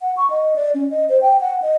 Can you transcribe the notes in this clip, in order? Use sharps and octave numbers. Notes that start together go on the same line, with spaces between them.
F#5
C#6
D#5
D5
C#4
D#5
C5
G5
F#5
D#5